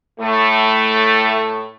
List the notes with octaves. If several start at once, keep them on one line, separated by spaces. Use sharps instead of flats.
A2 A3